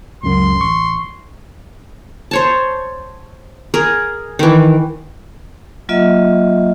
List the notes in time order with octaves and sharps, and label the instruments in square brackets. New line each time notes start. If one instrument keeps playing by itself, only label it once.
[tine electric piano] C#2 F#2 [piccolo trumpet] C6
[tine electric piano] A1 C#6
[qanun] C5 C#5 A5
G#4 A#4
D#3 E3
[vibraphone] F#3 A#3 F4 D#5 E5